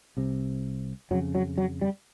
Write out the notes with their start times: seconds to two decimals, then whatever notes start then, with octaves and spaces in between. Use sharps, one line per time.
0.17 C2 C3
1.11 F2 C#3 F#3
1.35 F#3
1.58 F#3
1.81 G3